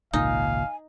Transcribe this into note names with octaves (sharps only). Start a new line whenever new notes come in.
G#1 C#2 A#2 D#4 F5 G#5